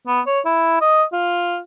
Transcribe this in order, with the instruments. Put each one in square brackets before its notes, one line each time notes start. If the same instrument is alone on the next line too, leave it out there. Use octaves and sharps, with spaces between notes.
[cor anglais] B3
C#5
E4
D#5
F4